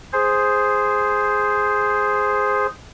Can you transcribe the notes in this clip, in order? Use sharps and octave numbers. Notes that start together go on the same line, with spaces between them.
G#4 C5